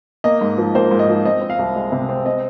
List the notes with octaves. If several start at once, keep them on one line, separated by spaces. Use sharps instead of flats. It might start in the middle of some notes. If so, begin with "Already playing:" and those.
A#3 D#5
G#2
F3
A#3 C5
G#2
D#5
F3
C4 D#5
C4
F5
C2
G#3
C3
C4
C4 D#5